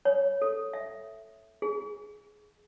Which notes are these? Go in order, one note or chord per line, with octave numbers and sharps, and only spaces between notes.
C#5
A4
E5
G#4